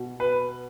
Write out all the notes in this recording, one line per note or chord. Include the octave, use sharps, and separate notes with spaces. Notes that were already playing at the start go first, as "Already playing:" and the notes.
Already playing: B2
B4